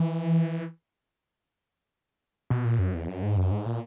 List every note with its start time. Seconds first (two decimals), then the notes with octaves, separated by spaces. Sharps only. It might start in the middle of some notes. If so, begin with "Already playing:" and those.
Already playing: E3
2.50 B2
2.65 A#2
2.79 F#2
2.94 E2
3.08 F#2
3.23 G#2
3.37 F#2
3.52 G#2
3.66 A#2